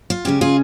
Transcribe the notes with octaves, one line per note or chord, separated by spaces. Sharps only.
F4
C#3 G#3 C#4 G4
F4 G#4